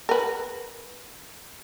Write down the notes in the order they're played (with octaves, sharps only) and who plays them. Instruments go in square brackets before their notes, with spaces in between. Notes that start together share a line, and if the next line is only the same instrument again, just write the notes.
[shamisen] A#4 B4